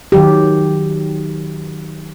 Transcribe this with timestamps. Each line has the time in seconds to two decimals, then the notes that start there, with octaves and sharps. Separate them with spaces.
0.12 D#3 F#3 G4